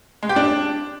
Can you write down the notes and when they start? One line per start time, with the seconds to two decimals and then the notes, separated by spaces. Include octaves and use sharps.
0.23 G#3
0.29 G4
0.36 D4